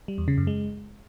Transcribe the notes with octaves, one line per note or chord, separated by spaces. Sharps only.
G3
E2
C#3
F#2
G#3